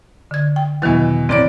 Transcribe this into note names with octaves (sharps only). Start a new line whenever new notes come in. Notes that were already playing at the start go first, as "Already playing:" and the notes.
D3 G#6
G5
E2 B2 D#3 E3 F#3
A1 C4 D5 D7